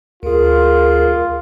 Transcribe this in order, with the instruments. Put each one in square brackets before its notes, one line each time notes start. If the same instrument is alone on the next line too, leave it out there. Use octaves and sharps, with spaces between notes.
[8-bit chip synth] D2 G#4 [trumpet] F4 [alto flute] A#4